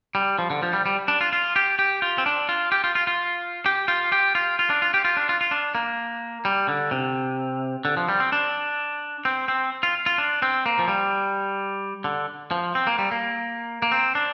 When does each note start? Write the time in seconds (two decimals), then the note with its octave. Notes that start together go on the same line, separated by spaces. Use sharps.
0.15 G3
0.39 F3
0.50 D3
0.63 F3
0.73 G3
0.86 G3
1.08 D4
1.21 F4
1.33 F4
1.56 G4
1.79 G4
2.02 F4
2.18 C4
2.26 D4
2.49 F4
2.72 G4
2.84 F4
2.95 F4
3.07 F4
3.66 G4
3.88 F4
4.12 G4
4.35 F4
4.59 F4
4.70 D4
4.82 F4
4.94 G4
5.05 F4
5.17 D4
5.29 F4
5.41 F4
5.51 D4
5.75 A#3
6.45 G3
6.68 D3
6.91 C3
7.85 D3
7.97 F3
8.09 G3
8.20 C4
8.32 D4
9.25 C4
9.48 C4
9.83 F4
10.06 F4
10.18 D4
10.42 C4
10.66 A#3
10.79 F3
10.88 G3
12.04 D3
12.51 F3
12.75 C4
12.87 A#3
12.99 G3
13.11 A#3
13.82 A#3
13.92 C4
14.15 D4